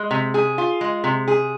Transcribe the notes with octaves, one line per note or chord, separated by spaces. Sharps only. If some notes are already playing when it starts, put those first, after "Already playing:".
Already playing: G#3
C3
G#4
F4
G#3
C3
G#4